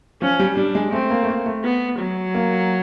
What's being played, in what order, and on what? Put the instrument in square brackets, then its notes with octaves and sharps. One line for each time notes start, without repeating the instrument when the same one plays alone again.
[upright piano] F3 [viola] C#4
[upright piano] G3
[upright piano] G3 [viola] D4
[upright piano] G#3
[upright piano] A3 [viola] C4
[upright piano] A#3
A3
A#3
A3
[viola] B3
F#3
[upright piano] A#3